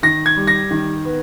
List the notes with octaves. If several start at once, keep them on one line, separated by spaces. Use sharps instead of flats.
D#3 A#6
G#6
G3
A#6
D#3
B3